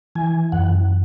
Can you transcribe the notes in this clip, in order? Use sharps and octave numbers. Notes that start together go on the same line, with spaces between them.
E3 G#5
F#2 F#5